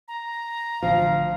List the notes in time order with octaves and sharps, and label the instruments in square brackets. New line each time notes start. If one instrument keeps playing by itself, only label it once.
[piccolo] A#5
[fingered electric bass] A1 D3 [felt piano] F3 [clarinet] F5